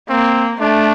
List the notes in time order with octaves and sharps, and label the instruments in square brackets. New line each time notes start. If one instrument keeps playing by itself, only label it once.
[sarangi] A#3 [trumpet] C4
[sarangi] A3 [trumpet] D4